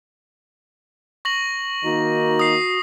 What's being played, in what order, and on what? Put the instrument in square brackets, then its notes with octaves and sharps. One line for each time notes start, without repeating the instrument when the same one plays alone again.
[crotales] C#6 A#6 F#7
[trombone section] D#3 A#3 D#4 [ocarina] F#4
[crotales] D#6 C7